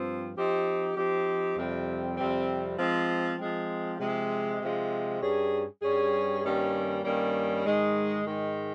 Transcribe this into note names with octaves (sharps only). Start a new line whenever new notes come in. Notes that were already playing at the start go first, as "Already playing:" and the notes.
Already playing: G2 F3 C4
F3 C4 D#4 G4
F3 C4 D#4 G4
F2 C3 G3 C4
F2 C3 G3 C4
F3 G#3 C4
F3 G#3 C4
C3 F3 G#3
C3 F3 G#3
G2 G3 C#4 G#4
G2 G3 C#4 G#4
G2 D#3 G3 A#3 C#4
G2 D#3 G3 A#3 C#4
G#2 D#3 G#3
G#2 D#3 G#3